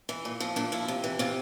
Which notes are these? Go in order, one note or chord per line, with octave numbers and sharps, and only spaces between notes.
E3
A#2
F3 C4
A#2 D4
F3 E4
C3
E3
C3 F4